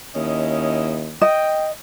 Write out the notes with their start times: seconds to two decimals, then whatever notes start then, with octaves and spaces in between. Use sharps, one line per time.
0.16 D#2 C#4 E4 D#5
1.21 D#5 G5